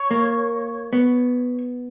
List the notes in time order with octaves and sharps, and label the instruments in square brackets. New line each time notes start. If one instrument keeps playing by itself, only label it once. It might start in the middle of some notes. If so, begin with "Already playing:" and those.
Already playing: [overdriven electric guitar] C#5
[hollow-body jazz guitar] A#3
B3